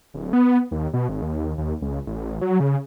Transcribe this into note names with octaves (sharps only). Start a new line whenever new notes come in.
D1
B3
D#2
B2
G#1
D#2
D#2
C#2
A1
F#3
C#3